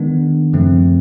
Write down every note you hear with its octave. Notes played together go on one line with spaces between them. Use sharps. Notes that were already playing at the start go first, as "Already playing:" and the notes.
Already playing: D#3 G#3 B3 D4
F#2 C#3 F3 A3 C4